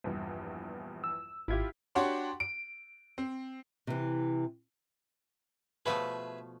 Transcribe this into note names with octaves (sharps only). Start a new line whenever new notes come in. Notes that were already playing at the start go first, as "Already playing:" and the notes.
A#1 E2 G2
E6
G#1 E4 F4 G4 G#6
D4 F#4 G4 C#5 F#5 C6
D7
C4
C3 E3
B2 F3 A3 G#4 B4 E5